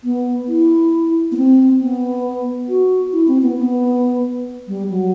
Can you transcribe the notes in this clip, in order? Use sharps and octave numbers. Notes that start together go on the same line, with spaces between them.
B3
E4
B3
C4
B3
F#4
E4
C4
B3
B3
G3
F#3